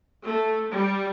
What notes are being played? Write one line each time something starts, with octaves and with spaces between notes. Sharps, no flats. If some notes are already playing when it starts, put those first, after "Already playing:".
A3
G3